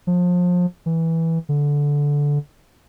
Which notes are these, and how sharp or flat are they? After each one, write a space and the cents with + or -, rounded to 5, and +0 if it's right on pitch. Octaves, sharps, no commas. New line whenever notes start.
F3 +30
E3 -10
D3 -15